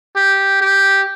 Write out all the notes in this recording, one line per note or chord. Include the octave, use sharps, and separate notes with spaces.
G4
G4